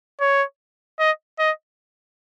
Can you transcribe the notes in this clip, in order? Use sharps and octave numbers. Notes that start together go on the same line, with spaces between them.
C#5
D#5
D#5